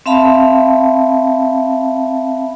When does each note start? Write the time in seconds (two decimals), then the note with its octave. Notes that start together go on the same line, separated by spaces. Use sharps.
0.06 C4 E5 F5 A5 B5